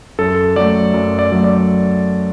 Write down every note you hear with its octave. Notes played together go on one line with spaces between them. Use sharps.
F#2 A4
F#3 A3 D5
F#2
D5
F#3 A3
D5